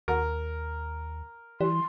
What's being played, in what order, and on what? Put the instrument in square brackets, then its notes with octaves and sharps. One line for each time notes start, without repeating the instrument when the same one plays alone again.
[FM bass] D#2 [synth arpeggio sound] F#4 [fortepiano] A#4
[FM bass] E3 [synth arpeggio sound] G3 [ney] C6